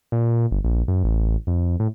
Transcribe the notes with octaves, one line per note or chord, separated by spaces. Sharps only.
A#2
G1
A#1
F#2
A1
F2
A2